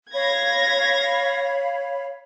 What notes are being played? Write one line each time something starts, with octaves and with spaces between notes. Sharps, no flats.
C#5 F5 B5 G#6 A#6